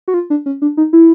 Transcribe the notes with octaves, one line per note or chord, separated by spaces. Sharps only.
F#4
F4
D4
C#4
D4
D#4
E4